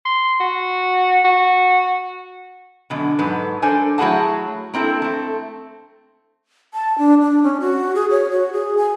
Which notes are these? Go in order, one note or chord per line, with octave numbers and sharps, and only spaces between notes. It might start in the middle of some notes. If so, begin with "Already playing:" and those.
C6
F#4
F#4
F#2 B2 D3
G#2 F#3 A4 B4
D4 A4 A#4 C5 G#5
F#3 A3 E4 G#4 F#5 A5
A#3 C4 E4 A4
A3 C4
A5
D4
D4
C#4
F#4
G#4
C#5
F#4
G#4
G#5